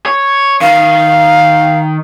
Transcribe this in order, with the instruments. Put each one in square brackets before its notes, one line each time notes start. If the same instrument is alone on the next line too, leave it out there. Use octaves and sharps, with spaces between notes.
[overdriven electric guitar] C#5
[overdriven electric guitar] D#3 [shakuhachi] F5